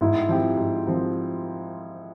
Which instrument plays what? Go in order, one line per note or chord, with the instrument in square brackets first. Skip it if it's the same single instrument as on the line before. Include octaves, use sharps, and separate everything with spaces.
[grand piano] G#2 [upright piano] E4
[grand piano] F3 C4 G4
G#2
F3 C4 G4